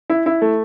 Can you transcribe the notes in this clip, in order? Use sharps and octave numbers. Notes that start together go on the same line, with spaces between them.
E4
E4
A3